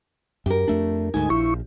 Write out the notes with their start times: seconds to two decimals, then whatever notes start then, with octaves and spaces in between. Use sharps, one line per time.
0.46 F#2 G4 A#4
0.68 F2 A3 D4
1.14 D2 G#2 D#4 G#5
1.30 A#1 F3 E4 C#6